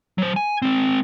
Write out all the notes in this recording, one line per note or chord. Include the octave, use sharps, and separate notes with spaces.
F#3 C5
G#5
G#3 C4